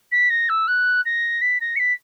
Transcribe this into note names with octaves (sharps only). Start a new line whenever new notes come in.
B6
A#6
E6
F#6
A#6
B6
A#6
C#7
B6